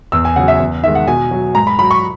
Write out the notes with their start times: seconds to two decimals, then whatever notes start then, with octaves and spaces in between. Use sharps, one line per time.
0.12 E2 E6
0.25 G#5
0.36 C#3 F#3 F#5
0.48 E5
0.60 E2
0.84 D#3 E5
0.88 G#3
0.95 F#5
1.07 B2 G#5
1.31 F#3
1.55 G#2 A#5
1.67 B5
1.79 F#3 B5
1.91 C#6